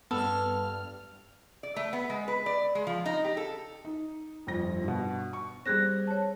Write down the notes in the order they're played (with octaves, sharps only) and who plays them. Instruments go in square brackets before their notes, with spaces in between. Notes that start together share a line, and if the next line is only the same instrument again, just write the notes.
[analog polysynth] G2 F6 [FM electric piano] B3 [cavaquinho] A4
[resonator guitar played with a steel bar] D5
A3
B3
G#3
B4
D5
G#3
F3
D#4
G4
A4
[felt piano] D#4
G1 F2 A#6
G2 B2
C#6
[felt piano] G3 C4 [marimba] G#4 F#6 A#6
[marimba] C#5 A5